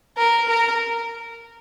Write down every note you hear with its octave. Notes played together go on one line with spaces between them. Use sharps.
A#4
A#4